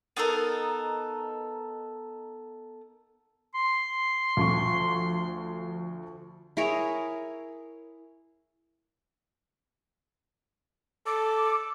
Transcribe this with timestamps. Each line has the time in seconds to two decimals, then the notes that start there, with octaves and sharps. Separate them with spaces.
0.17 B3 D#4 A4 A#4
3.55 C6
4.37 D2 F3 C#6
6.57 E4 G#4 A#4 C#5
11.06 A4 D6